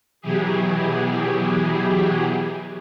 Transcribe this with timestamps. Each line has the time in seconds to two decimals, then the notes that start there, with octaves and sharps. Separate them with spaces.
0.21 B2 E3 F#3 E4 G4 G#4